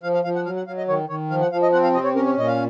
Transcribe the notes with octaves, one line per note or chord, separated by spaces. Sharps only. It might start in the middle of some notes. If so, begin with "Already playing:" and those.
F3 F5
F5
F3 F5
F#5
F#3 F5
F#5
F#3 F5
D#5
D#3 C#5
D#3 C#5
F3 F5
F#5
F3 F5
D#5
C4 F#5
F5
C3 D#5
C#5
C#4 A#4
C#5
A#2 D#5
F5